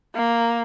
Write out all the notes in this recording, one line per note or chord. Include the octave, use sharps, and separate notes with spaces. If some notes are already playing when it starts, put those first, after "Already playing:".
A#3